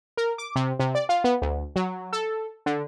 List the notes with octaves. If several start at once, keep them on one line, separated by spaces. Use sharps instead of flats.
A#4
D6
C3
C3
D5
F4
B3
D2
F#3
A4
D3